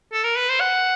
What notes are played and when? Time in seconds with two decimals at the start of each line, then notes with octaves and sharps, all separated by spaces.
0.13 A4
0.24 A#4
0.37 B4
0.49 C5
0.60 F#5